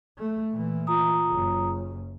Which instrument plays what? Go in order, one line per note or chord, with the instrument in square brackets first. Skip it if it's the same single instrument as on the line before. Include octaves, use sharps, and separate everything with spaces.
[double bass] A3
A#2 E3
[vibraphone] F4 A#5 D#6
[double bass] F#1 F#2